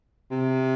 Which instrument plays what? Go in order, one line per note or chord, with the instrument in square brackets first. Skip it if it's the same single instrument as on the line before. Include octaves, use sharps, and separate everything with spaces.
[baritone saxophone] C3